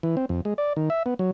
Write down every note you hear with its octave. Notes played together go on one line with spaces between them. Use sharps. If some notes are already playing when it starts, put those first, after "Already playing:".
E3
C4
F2
G#3
D5
D#3
E5
B3
F#3